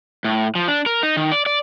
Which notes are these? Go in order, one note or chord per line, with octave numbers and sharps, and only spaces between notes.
A2
F3
D4
A#4
D#4
D#3
D5
D5